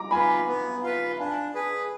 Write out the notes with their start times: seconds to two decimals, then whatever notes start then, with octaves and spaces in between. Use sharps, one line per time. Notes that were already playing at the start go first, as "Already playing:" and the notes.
Already playing: A#5 D6
0.11 F4 B4 G#5 B5
0.48 B3
0.83 F4 B4
1.18 D4 F5 G#5
1.54 G#4 B4